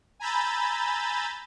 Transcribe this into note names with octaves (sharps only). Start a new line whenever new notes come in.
G#5 A#5 B5 E6 G6 A6